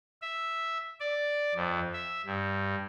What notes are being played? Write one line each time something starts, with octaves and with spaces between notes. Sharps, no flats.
E5
D5
F2
E5
G2